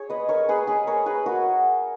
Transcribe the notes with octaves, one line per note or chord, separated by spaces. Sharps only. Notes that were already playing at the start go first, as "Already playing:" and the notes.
Already playing: G#4 C#5
B4 D#5
A#4 C#5
G#4 B4
G#4 B4
A#4 C#5
G#4 B4
F#4 A#4